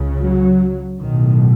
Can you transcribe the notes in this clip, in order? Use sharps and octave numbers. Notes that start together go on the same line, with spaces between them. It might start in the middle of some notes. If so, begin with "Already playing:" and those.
Already playing: C#2 C#3
F#3
B1 A2 D#3